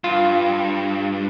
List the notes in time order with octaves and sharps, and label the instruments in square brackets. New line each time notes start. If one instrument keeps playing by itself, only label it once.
[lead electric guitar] G2 [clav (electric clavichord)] F4